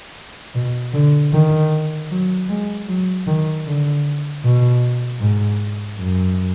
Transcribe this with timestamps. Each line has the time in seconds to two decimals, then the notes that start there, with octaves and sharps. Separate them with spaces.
0.55 B2
0.94 D3
1.33 D#3
2.10 F#3
2.49 G#3
2.88 F#3
3.27 D#3
3.66 D3
4.43 B2
5.21 G#2
5.98 F#2